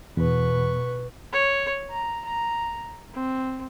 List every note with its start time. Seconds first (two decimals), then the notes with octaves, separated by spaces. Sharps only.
0.17 E2 B2 B4 C#6
1.33 C#5
1.91 A#5
2.25 A#5
3.14 C4